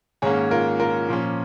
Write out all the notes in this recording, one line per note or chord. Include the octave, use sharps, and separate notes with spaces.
G#2 D#3 A#3 C#4 G#4 C#5
F4 A#4
F4 A#4
A#2 F3 A#3 C#4